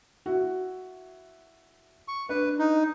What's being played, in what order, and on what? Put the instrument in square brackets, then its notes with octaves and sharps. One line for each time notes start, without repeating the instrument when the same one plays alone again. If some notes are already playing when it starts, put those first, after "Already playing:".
[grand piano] E4 F#4
[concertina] C#6
[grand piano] D4 [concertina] B4
[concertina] D#4